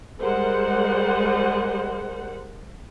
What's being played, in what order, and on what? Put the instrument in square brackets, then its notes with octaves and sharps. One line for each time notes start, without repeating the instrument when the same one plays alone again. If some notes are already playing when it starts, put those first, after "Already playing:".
[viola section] G3 G#3 A#4 C5 F#5